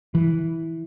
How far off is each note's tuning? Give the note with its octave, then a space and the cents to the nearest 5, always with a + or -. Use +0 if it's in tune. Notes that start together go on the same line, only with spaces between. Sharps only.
E3 -10